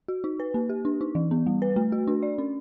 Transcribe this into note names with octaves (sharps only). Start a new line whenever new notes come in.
F#4
D#4
B4
A#3
G4
D4
D#4
E3
B3
G3
B4
A3
F#4
D4
D5
C#4